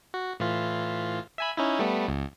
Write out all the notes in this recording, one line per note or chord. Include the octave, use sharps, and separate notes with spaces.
F#4
A2 E3 F4
E5 G#5 B5
C#4 D#4 E4
G3 A3 B3
C#2